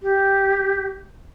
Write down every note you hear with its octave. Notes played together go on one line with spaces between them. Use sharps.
G4